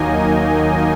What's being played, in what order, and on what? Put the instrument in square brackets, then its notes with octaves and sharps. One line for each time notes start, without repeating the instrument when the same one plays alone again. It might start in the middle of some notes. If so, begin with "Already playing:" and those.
Already playing: [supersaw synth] D#2 D#3 F#3 A#3 D#4 D#5 G#5